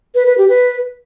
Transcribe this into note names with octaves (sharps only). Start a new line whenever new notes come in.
B4
B4
G4
B4